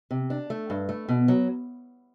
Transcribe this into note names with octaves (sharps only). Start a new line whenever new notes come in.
C3
D4
A3
G2
A3
B2
F#3